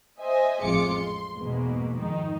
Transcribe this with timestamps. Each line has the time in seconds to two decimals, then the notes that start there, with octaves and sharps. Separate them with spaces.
0.19 C5 D#5 E5 G#5
0.63 A1 F2 G#3 F4 D6 C#7
0.93 C6
1.37 E2 G#2 B2 G#3 A#3
1.97 F2 G#2 D#3 D#4